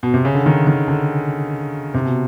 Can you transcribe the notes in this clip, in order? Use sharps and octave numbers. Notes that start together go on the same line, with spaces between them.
B2
C3
C#3
D3
D#3
D#3
D3
C3
B2